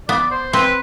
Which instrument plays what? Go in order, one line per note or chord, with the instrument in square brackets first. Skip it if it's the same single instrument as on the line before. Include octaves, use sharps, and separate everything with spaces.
[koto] B3 [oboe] D5
[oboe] C5
[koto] C4 [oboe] B4